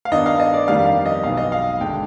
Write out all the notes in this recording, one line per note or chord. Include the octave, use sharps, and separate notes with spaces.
F5
G2 D#3 B3 D4 D#5
F5
D#5
D5
F2 D#3 G3 D4 F5
F5
D#5
B1 B2 B3 F5
D#5
F5
G#1 G2 D3 G#3 G5